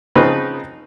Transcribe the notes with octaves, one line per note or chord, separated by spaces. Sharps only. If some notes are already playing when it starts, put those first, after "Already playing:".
C#3 F3 C4 D#4 B4